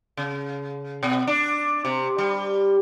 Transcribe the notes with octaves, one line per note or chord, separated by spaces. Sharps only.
C#3
B2
D4
C3
G3